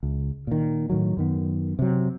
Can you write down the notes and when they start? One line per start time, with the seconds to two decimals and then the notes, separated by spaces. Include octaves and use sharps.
0.03 C#2
0.47 A#2 D#3
0.90 A2 D#3 F#3
1.17 F#2 D#3 B3
1.79 C3 F#3